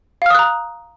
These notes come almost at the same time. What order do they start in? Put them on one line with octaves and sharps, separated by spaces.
F5 F6 D#6 F#6 A#5